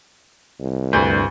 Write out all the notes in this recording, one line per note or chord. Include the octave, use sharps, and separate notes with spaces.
C2
D2 G2 B4 G6